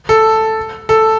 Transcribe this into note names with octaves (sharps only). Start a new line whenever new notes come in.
A4
A4